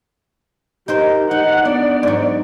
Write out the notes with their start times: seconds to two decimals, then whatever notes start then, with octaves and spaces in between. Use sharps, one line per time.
0.88 D#4 G4 A#4 C5
1.31 D#4 F#5
1.65 B3 D4 D5
2.03 G#2 F#3